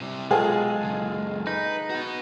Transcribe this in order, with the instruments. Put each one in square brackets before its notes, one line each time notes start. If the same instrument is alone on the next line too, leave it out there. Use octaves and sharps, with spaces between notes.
[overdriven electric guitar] C3 G3
[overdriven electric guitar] B1 [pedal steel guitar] G#3 [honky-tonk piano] F4 G#4 A4
[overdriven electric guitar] C#2 F#2
[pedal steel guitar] D#4 [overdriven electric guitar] B4
[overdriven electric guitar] F#4 B4